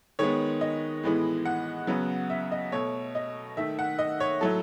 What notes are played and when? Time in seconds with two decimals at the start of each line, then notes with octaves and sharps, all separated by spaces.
0.19 D#3 G#3 B3 C#5
0.61 D#5
1.04 A2 E3 G#3 B3
1.45 F#5
1.87 C#3 F#3 B3
2.30 E5
2.51 D#5
2.72 B2 A3 C#5
3.15 D#5
3.57 D#3 A3 E5
3.79 F#5
3.99 D#5
4.20 C#5
4.41 A2 F#3 A3 A4